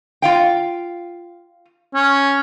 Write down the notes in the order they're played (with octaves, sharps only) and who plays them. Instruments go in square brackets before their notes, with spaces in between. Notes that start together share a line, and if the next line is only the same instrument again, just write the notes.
[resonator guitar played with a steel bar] F4 F5 G5
[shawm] C#4